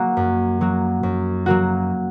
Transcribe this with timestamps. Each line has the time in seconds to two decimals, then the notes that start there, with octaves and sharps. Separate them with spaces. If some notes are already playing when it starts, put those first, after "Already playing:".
Already playing: F#3 A#3 F#4
0.17 F#2
0.61 F#3 A#3 F#4
1.03 F#2
1.46 F#3 A#3 F#4